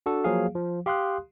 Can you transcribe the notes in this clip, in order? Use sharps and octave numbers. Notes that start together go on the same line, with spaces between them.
D4 F#4 A4
F3 F#3 A#3 G#4 F5
F3
G4 F5 C6 D#6 F#6